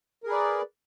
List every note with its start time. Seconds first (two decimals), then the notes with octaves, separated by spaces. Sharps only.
0.24 A#4
0.26 G#4
0.29 B4
0.32 D5